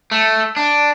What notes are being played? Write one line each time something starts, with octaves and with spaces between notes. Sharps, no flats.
A3
D4